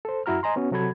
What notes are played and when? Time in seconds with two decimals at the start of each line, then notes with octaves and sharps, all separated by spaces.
0.05 A4 C5
0.26 F#2 E4 F#4 A#5 F6
0.43 D#5 G#5 A#5 C6
0.56 B3 C#4 F#4
0.72 C3 F#3 F#4 A4 B5 G#6